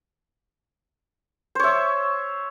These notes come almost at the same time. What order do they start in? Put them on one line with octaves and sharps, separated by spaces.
C5 C#5 E5